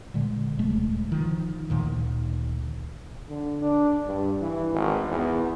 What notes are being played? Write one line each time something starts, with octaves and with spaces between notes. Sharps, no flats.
A#2 D3 G#3
D#1 C3 G#3 A3
D#3 F3
D2 A#2 D#3
D3
D4
G2
E3
G#1
E2